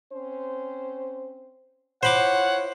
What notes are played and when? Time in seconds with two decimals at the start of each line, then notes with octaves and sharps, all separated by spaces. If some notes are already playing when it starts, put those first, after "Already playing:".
0.13 C4 C#4 C5
2.03 E4 F4 C5 C#5 F#5 B5 D6